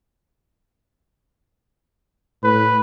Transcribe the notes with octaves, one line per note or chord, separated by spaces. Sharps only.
A2 B4